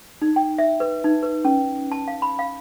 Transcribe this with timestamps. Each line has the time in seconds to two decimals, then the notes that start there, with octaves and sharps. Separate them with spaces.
0.22 D#4
0.36 G5
0.58 E5
0.80 B4
1.04 D#4
1.23 B4
1.45 C#4
1.92 A5
2.08 F5
2.22 B5
2.39 F5